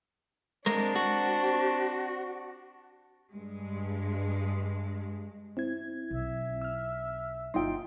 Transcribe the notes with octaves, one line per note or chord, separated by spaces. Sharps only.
G#3 C4 D4 A#4
F#4
G2 G#3
C4 E4 G#6
B1 E5
E6 F6
G1 A#3 D#4 F4 G5 C6